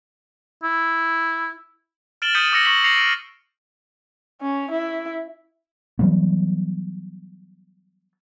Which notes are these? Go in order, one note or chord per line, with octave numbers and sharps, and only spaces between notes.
E4
F6 A6 D7 E7 F#7 G7
D#6 G6 B6 C#7 D#7
D6 E6 A#6 C#7 F#7
C#6 A#6 B6 C#7 F#7
G6 A#6 C7 C#7 F7
F6 D7
C#4
E4
E3 F#3 G3 B3